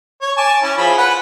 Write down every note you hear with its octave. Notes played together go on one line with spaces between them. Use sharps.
C#5
G#5 A5 D6
C#4 E4
F3 G#4 B5
B4 F#5